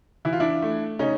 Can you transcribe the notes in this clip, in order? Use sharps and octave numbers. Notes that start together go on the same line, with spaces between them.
E3 E4
F4
D4 E4
A3
C#3 C#4 D#4